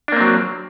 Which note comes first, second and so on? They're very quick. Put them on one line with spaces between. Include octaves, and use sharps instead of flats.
D4 A#3 C4 F#3